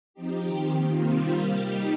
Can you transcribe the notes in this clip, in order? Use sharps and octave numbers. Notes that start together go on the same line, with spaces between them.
F3 C4 D#4 G4
D#3 C4 G4
D#3 A#3 F4
C3 D#3 G3 C4 F4
G3 A#3 G4
G3 D#4 G4